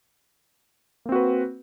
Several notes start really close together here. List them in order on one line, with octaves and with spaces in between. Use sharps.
A#3 C4 F#4 B4